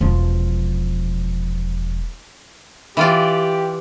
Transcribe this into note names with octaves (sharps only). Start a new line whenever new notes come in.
E1 F3
E3 F4 G4 D5